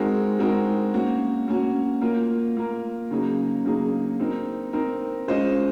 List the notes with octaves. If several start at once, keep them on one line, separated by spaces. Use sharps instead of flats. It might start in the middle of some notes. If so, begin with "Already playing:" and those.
Already playing: G#3 C4 D#4 F#4 A#4
G#3 C4 D#4 F#4 A#4
A#3 C#4 F#4
A#3 C#4 F#4
A#3 F4 A#4
A#3 F4 A#4
C#3 F#3 A#3 D#4 G#4
C#3 F#3 A#3 D#4 G#4
C4 D#4 A#4
C4 D#4 A#4
G#3 C#4 F4 C5 D#5